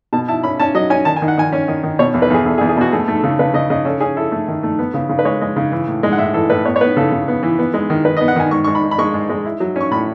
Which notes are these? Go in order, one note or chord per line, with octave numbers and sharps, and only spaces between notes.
B2 A5
E4 A5
C#4 B5
C#4 A5
F#3 D#5
C#4 G#5
D#3 A5
G#5
D#3
F#5
D#3 G#5
C#4
D#3
D#3
B2 C#5
E2
B4
E2 G#4
E2 A4
G#4
E2
G#4
B2 F#4
A3 G#4
A3
A4
C#3
C#3 B4
C#3 D#5
C#3 D#5
C#4 A4
C#4 G#4
E4 A4
A3
D#3
A3
B3
C#3
C#3
B4
G#3 C#5
G#3
C#3
E3
A2
G#3
F#5
A2 E5
E3 A4
A2 B4
B3 C#5
C#5
B3 B4
C#3 A4
C#3
B3
E3
B3
G#3
D#3
D#3 B4
D#5
B3
F#5
D#3 G#5
G#2 C#6
G#2 C#6
B5
G#2
B5
G#3 C#6
G#2
G#3
E4
F#3
C#4 C#6
A2 B5